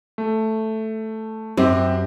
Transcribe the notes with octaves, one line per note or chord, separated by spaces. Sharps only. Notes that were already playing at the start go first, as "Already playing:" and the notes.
A3
F#2 C4 G4